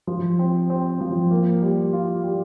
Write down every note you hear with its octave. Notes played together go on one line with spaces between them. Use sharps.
F3
C4
C4
F3
A#3
G3
F4
G3